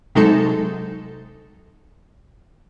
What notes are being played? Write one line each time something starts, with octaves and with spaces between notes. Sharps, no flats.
C3 F#3 G#3 D#4 A4